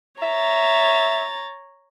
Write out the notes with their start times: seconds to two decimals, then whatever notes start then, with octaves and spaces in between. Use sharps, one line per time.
0.22 C#5 E5 A#5 A6